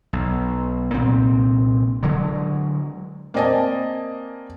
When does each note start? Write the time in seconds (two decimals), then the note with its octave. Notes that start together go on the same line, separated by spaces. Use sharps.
0.13 B1
0.94 C2 A#2 C4
2.03 D3 F#3 G#3
3.34 A#3 C4 D5 D#5 G#5 A5